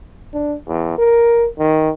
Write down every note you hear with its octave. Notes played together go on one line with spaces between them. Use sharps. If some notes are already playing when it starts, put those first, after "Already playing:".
D4
E2
A#4
D#3